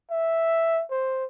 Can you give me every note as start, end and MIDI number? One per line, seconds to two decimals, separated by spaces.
0.11 0.83 76
0.91 1.25 72